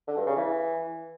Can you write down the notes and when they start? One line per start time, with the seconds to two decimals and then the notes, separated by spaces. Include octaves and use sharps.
0.08 D3
0.17 G2
0.27 C#3
0.36 E3